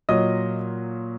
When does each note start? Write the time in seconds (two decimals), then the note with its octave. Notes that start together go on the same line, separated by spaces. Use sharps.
0.09 A#2 F#3 D#5 D#6